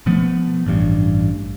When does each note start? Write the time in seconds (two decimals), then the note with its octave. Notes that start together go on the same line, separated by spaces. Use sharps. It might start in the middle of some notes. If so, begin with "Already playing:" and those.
0.06 B2 F3 A3 B3
0.66 A1 G2